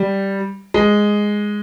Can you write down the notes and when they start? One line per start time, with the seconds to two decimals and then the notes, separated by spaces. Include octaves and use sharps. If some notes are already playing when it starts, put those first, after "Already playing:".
Already playing: G3
0.74 G#3